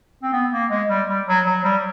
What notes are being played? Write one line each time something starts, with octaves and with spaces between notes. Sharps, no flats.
C4
B3
A#3
G#3
G3
G3
F#3
F#3
G3